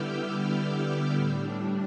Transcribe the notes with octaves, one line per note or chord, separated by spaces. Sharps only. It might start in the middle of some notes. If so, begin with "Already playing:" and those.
Already playing: D3 G3 B3 E4 D6 E6 F6 G6
E6 G6
A2 G3 D4